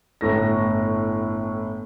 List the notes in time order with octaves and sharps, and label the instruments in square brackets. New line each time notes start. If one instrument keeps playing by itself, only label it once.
[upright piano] G1 A2 A#6